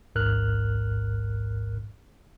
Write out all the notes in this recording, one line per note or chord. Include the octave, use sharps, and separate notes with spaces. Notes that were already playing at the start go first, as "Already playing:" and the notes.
A1 D2 G#2 A#4 F6 F#6